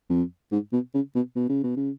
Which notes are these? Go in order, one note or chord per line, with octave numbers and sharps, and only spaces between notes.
F2
G#2
B2
C#3
B2
B2
C#3
B2
C#3